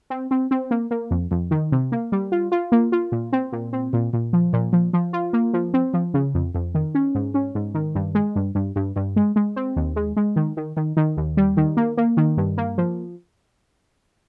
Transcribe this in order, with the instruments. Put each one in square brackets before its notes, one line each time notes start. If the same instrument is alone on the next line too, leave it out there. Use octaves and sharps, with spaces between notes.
[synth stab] C4
C4
C4
A#3
A#3
F2
F2
D#3
C3
A#3
G3
F4
F4
A#3
F4
A#2
C4
A#2
C4
A#2
A#2
F3
A#2
F3
F3
F4
A#3
F3
C4
F3
C#3
F2
F2
D#3
C#4
G#2
C#4
G#2
D#3
G2
G#3
G2
G2
G2
G2
G#3
G#3
C4
D#2
G#3
G#3
D#3
D#3
D#3
D#3
D#2
G3
D#3
A#3
A#3
D#3
G2
A#3
F3